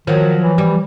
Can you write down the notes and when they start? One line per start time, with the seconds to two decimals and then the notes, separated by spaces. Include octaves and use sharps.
0.07 D#3 F3 F#3
0.42 E3
0.58 G3